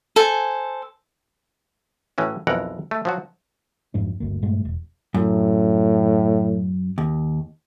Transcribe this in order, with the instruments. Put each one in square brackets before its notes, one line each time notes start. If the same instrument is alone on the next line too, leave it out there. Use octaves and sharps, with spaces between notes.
[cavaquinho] A4 C5 G#5
[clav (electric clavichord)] A2 E3 C#4 F#4
B1 F2 E3 A#4 F#5
A3
F3 F#3 F#4
[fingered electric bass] F#1 F2 G#2 D4
G1 D2 A#3
G2 A#2 G#3 A3
E1
[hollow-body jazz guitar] F#2 [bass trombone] A2
[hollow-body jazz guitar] D#2